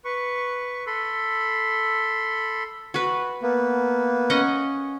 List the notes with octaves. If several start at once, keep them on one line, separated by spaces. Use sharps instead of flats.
B4 C#6
A4 B5 C6
F#4 B4
A#3 B3
C#4 D#5 F#5